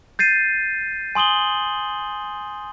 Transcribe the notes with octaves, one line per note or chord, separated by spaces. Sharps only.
G6 A6 C7 D#7
G#5 C6 D#6 F#7 G7